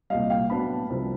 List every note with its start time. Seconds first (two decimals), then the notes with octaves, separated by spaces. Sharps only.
0.10 C2 A#2 G3 D#5 F5
0.30 F5 G5
0.50 A2 F#3 B3 D4 A5 B5
0.90 C2 C3 F3